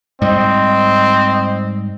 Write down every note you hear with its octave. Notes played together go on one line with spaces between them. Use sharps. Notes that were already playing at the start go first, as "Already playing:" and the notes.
G#2 G3 C4 D#5